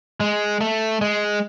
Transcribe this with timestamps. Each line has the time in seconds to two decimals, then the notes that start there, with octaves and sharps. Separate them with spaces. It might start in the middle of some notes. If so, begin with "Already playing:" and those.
0.20 G#3
0.61 A3
1.01 G#3